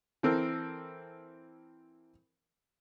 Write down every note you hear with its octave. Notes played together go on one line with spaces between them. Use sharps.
E3 C4 A4 A#4